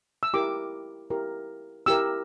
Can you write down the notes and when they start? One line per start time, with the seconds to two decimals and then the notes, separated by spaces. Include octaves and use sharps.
0.23 E6
0.34 E4 G4 A#4 D6
1.10 E4 G4 A#4
1.86 E4 G4 A#4 E6